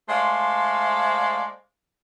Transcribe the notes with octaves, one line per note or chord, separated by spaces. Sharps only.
G#3 A3 C5 D5 F5